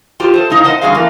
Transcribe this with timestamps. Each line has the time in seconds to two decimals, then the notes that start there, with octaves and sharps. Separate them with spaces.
0.20 F4 G4 C5
0.34 A4 C5
0.50 A2 C#3 D#4 F5
0.64 C5 D#5 F#5
0.81 G2 D3 C#4 F#4 G#4 F5
0.95 E3 A3 A#3